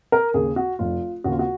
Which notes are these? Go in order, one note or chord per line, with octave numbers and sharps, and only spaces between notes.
A#4
D#2 C#3 G#4
F#4
F1 F4
D#2 C#3 F#4
F4
F#4